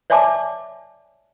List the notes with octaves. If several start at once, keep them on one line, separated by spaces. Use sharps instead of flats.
C#5 D5 E5 G#5 A5 D6